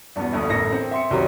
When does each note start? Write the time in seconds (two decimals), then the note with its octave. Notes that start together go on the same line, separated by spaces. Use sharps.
0.16 E2 G2 B2 B3
0.32 G1 D2 G2 D3 D#6
0.49 A1 A4 A#4 A#6 C#7
0.72 C4
0.91 E5 C6 C#7
1.11 C2 D#3 F#3 G3 C4